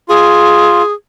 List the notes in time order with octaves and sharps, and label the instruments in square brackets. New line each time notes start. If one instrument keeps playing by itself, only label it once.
[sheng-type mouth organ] F4 [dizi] G#4